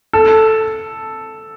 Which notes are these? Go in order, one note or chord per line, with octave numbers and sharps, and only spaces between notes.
A4